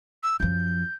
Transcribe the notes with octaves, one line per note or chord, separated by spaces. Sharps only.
E6
F#2 F3 G6